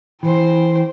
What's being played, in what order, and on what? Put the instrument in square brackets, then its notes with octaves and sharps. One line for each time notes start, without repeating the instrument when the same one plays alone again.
[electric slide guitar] E3 [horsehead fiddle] C5 G5